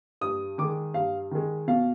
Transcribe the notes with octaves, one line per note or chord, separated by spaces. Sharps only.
G2 D#6
D#3 G#3 D6
G2 F5
D#3 G#3
B2 F5